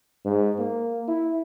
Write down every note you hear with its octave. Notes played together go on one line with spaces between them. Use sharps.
G#2
A#3
E4